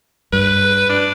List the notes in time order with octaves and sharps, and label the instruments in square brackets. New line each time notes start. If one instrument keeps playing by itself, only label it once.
[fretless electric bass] G2 [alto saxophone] B4
[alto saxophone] D4